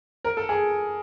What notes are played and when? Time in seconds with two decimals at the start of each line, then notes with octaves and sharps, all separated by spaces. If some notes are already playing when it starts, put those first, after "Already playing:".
0.24 A#4
0.37 A4
0.49 G#4